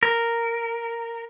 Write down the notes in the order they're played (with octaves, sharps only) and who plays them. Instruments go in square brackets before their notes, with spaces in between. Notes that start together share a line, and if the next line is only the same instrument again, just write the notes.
[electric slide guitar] A#4